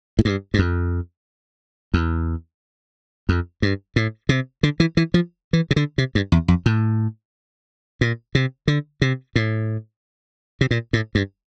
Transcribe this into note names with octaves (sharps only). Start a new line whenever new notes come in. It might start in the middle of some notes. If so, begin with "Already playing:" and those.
A2
G2
G2
F2
E2
F2
G2
A2
C3
D3
E3
E3
F3
E3
C3
D3
C3
G2
E2
F2
A2
A#2
C3
D3
C3
A2
C3
A#2
A2
G2